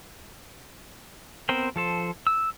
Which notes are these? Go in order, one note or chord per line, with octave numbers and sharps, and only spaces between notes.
B3 C4 A#4 C5 G5
F3 A4 C5
E6